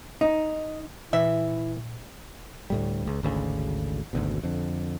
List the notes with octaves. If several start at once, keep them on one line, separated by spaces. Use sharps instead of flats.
D#4
A#2 E3 E4 E5
D2 A2 G3
C#2
G#1 D2 C#3
G#1 D2 B2
F2 D3